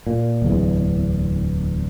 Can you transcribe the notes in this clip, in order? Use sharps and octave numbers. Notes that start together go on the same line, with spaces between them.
A#2
D1 E2